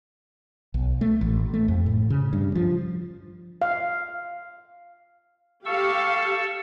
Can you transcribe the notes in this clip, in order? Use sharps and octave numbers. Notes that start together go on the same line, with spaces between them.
B1
A3
A1
A3
F2
A2
C#3
G2
F3
F5
G4 A4 F5 C#6 E6